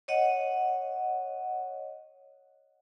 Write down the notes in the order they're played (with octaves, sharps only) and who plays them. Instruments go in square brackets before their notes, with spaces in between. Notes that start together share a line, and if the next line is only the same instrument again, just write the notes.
[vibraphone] C#5 D#5 F#5